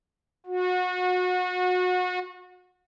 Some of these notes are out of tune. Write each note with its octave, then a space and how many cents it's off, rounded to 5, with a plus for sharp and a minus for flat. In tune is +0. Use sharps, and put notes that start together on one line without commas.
F#4 -30